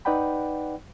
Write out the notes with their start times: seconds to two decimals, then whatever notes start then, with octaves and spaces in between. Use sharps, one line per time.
0.05 D#4 B4 D5 F#5 G5 B5